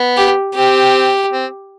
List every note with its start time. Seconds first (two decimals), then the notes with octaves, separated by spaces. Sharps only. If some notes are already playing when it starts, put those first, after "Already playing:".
Already playing: B3
0.17 G4
0.55 C4 G4
1.32 C4